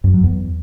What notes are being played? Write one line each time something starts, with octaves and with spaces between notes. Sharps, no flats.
F#2
F#3
E2